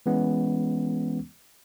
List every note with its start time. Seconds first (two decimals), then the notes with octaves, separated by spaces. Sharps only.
0.06 E3 G#3 B3 C#4